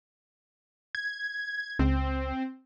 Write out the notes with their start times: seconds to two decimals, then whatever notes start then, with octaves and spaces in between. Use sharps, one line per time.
0.95 G#6
1.79 C#2 C4